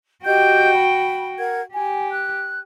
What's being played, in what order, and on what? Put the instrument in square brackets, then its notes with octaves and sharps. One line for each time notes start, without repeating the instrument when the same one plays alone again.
[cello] F#4 G5 [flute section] G4 D#5 G6
[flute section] B5
A#4 F#5 G#6
[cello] G4 [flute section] G#5
[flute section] F#6